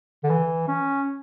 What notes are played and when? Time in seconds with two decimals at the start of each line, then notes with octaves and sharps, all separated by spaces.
0.24 D3
0.30 E3
0.68 C#4